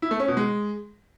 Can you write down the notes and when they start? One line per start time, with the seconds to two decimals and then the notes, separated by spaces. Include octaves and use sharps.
0.02 E4
0.11 A3
0.20 C#4
0.28 B2
0.37 G#3